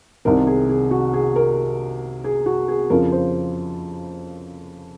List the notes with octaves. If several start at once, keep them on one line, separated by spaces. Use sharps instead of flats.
C2 C3 D#3 A#4
G#4
G#4
F#4
G#4
A#4
G#4
F#4
G#4
F2 C#3 F3 A#4
C5